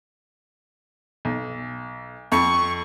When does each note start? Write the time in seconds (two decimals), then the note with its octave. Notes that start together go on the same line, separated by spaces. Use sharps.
1.25 B1
2.32 F2 C#6